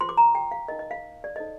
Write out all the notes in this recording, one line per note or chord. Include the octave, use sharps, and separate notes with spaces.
F4 C5 C6
D6
A#5
G5
F5
D#4 A#4 D#5
D#5
F5
D5
D#4 A4 C5 D#5